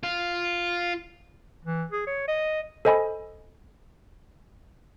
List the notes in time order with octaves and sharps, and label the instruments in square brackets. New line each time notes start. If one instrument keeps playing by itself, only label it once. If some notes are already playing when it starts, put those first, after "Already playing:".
[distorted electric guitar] F4
[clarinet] E3
G#4
C#5
D#5
[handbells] A4 C5 D#5 G#5 B5